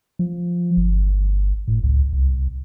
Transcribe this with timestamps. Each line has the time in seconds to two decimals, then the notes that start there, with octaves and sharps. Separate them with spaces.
0.19 F3
0.77 G1
1.68 A2
1.83 C#2
2.13 C2